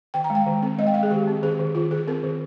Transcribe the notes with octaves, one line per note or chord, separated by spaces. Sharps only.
D#3 G5
A#5
G#3
G5
D#3
C4
G#3 D#5
G5
G#3 F5
G#4
D#3 G4
C4
D#3 G#4
D#3
D#3 F4
D#3 G#4
C4 A#4
D#3